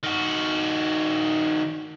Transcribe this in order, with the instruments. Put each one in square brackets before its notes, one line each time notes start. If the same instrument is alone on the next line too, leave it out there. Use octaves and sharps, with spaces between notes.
[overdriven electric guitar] D#3 F#4